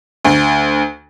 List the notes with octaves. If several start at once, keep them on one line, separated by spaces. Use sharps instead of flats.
D2